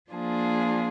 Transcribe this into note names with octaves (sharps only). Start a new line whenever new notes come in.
F3 A#3 D4 F4 G#4